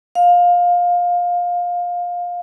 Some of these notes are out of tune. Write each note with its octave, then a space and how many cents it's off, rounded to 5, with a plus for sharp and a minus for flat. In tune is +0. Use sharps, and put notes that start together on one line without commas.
F5 +20